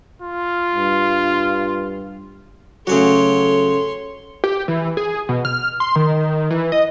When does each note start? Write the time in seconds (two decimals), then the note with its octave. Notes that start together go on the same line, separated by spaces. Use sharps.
0.22 F4
0.75 G2
2.87 C#3 F#3 A3 C#4 F#4 A4 C#5 C6
4.44 G4
4.68 E3
4.97 G#4
5.29 B2
5.45 F6
5.80 C6
5.96 D#3
6.51 E3
6.72 D#5